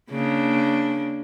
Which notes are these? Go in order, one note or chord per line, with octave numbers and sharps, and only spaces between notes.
C#3 A#3 D4